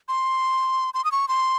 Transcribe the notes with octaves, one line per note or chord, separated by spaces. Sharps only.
C6
C6
D#6
C#6
C6